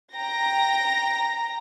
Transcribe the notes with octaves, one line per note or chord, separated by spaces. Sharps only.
G5 A#5 A#6